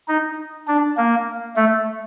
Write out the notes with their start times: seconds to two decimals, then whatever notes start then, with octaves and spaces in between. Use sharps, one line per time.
0.08 D#4
0.68 D4
0.97 A#3
1.56 A3